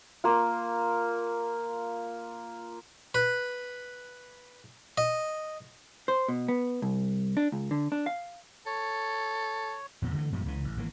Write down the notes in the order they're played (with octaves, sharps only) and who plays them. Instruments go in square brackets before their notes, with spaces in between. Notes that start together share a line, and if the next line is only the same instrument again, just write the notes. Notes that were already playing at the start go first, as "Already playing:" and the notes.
[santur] A#3 F4
[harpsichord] B4
D#5
[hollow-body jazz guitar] C5
B2
B3
C2
D4
C#2
D3
D4
F5
[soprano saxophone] A4 [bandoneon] C#5
[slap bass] E2 A#2
D3 E3 A3
F#2 A#2 F3 G3
C#2 C#3 E3
A1
G#1 E3 A#3